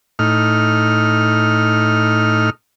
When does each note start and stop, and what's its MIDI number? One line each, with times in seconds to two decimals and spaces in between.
0.19 2.50 45
0.19 2.50 63
0.19 2.50 89